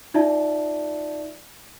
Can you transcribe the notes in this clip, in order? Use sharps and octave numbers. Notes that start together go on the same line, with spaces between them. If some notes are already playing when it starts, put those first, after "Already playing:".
D#4 F4 D5 E5 A5